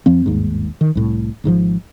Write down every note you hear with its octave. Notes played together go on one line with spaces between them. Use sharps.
F2 F3 C4
G1 D#2 G#2
D#3
C2 A2
G#1 G#2 D3 F3